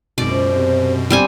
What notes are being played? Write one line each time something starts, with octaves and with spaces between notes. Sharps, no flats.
G#1 F#2 B2 D5
C#2 C5
C3
G1 G3 C4 G#5